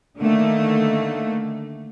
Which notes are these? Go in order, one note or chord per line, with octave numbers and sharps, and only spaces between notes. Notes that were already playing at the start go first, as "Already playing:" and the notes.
D3 D#3 A3 A#3